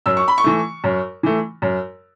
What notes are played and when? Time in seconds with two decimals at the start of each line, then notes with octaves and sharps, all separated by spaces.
0.06 F#2 E6
0.17 C#6
0.28 B5
0.38 C#6
0.44 E3 A3
0.84 F#2
1.23 E3 A3
1.62 F#2